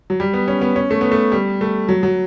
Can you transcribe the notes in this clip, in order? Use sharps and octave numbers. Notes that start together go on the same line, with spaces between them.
F#3
G3
B3
C#4
B3
C#4
A3
B3
A3
G3
A3
F#3
F#3